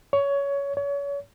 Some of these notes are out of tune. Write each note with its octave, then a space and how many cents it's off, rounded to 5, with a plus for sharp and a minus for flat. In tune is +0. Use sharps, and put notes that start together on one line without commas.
C#5 +20
C#5 +35